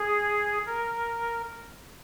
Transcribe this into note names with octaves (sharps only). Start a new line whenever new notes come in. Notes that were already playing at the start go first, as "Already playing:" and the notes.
Already playing: G#4
A#4